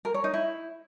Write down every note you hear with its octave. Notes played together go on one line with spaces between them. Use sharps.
A#4
C#5
D#4
E4